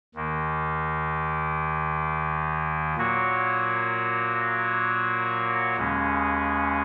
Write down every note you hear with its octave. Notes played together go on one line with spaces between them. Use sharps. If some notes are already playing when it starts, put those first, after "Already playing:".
D#2 D#3 A#3
A#2 F#3 A#3 F#4 C#5
D#2 C#3 G#3 C#4